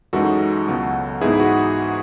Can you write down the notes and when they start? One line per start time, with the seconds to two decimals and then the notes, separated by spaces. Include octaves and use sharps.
0.13 F#2 E3 G#3 D#4 F#4 A4
0.67 C#2 B2 F#3
1.21 G#2 E3 B3 D#4 E4 G#4
1.40 F#4